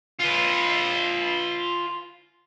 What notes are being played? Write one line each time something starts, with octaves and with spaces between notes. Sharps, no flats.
F4 B4